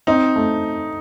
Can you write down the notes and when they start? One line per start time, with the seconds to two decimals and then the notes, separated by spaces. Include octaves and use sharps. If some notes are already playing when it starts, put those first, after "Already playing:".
0.07 C4 D#4
0.36 A3